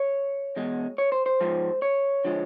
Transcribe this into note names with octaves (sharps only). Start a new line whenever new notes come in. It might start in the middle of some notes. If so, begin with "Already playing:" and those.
Already playing: C#5
E2 B2 G#3
C#5
C5
C5
G#2 F3 G#3
C#5
D3 F3 G#3